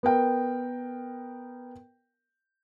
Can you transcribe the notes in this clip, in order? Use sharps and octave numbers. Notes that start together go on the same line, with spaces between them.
B3 A#4 G5